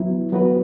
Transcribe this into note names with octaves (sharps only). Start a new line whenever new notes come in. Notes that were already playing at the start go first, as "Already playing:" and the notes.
Already playing: F#3 B3 E4
F#3 B3 F#4 B4